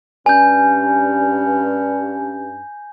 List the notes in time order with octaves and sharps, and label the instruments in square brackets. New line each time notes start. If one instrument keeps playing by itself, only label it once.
[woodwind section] G2 C#4 [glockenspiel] G#5 G6